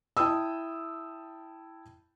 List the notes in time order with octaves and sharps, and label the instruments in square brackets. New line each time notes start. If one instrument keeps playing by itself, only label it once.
[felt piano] E4 G5 A5 D#6 E6